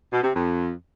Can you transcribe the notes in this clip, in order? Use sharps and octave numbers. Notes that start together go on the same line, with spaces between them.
B2
C3
F2